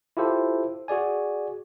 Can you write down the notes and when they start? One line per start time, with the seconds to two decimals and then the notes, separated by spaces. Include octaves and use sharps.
0.17 E4 F4 G4 A4 C5
0.88 F#4 G#4 D5 G#5